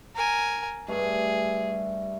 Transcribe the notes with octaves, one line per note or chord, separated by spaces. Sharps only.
A#4 G#5
G2 A3 G#4